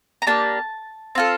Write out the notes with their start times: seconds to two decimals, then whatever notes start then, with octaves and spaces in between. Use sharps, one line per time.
0.22 A#5
0.27 A#3 D4 G4 A5
1.15 C4 F4 A4